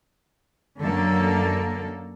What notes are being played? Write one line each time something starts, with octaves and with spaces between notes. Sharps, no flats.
F#2 D3 F#3 A#3 A4